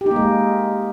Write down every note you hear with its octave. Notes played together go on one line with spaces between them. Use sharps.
G4
D#4
A#3
G#3